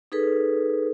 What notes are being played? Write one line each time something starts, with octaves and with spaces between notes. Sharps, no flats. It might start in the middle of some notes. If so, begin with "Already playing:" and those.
D#4 G#4 A4 B4